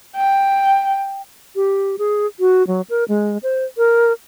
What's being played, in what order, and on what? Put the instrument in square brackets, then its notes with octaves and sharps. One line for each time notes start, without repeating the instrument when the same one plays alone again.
[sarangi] G5
[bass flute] G4
G#4
F#4
F#3
A#4
G#3
C5
A#4